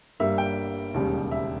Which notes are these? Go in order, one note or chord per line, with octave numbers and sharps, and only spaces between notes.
G1 G2 G3 A#3 E5
G5
E1 D#2 C#3 G3
E5